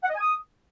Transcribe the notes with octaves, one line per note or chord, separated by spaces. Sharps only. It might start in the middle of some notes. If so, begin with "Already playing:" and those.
F#5
D#5
G#5
D#6